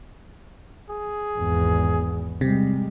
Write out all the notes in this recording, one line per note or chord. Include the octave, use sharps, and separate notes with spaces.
G#4
G#1 E2
C3 G3 G#3